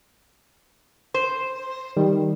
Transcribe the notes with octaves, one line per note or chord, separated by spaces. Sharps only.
C5
D#3 G3